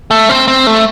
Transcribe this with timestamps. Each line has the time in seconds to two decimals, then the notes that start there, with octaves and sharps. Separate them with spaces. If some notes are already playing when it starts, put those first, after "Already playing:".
0.11 A3
0.29 C4
0.48 C4
0.67 A3